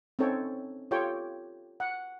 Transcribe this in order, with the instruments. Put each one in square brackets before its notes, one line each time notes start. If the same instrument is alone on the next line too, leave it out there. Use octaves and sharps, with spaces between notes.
[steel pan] C4 C#4 D#4 A4 C#5 G5
F4 G4 A4 C#5 G5
F#5